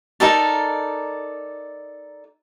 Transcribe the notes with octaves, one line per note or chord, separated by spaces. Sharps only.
D#4 A4 A#4 D5